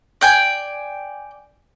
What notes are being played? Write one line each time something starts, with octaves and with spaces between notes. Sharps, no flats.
D5 G5 G#5